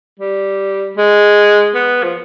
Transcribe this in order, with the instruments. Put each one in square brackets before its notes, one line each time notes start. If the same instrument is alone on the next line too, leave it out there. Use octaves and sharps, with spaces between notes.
[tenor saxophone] G3
G#3
B3
F3